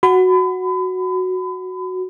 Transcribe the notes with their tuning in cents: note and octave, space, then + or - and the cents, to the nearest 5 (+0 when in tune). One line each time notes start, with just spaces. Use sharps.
F#4 +0 B5 +35